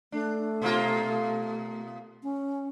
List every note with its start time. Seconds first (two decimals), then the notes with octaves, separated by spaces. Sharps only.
0.12 A3 D4
0.62 B2 A#3 F4
2.23 C#4